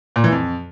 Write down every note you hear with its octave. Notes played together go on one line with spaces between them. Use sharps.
A#2
E3
F2